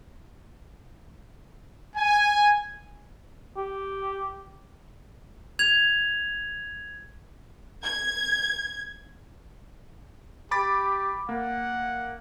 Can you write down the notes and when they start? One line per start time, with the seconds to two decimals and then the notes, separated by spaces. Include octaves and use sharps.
1.96 G#5
3.57 G4
5.59 G#6 F7
7.84 G#6
10.51 G4 B5 D6 A6
11.29 A#3 F#5